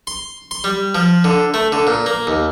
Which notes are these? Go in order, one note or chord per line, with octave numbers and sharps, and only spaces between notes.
C6
C6
G3
F3
D3
A3
D3
A#2
A#3
D#2